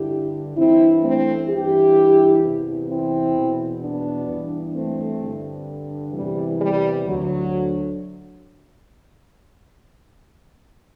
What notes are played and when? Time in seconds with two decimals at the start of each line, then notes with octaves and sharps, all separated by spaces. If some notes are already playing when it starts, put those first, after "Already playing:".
Already playing: G2 D3 E4 G4
0.56 G2 E3 C4 E4
1.02 A3 C4
1.48 G2 E3 E4 G4
2.41 E2 C3 E3
2.87 C4 E4
3.34 E2 B2
3.80 B3 D4
4.27 G2 E3
4.73 A3 C4
5.20 G2 D3
6.12 E2 C3 E3 G3
6.59 G3
7.05 D2 D3 F#3